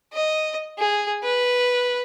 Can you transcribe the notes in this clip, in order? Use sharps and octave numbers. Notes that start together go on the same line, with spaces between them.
D#5
G#4
B4